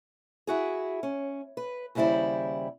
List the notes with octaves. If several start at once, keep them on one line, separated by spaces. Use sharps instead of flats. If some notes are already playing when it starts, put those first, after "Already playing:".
E4 F#4 G#4
C#4
B4
D#2 C#3 G3 E4 C5 D5